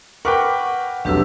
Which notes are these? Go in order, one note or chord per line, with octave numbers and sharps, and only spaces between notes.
A#4 B4 F#5 G5 C#6 D6
F1 B1 D4 G4 B4 E6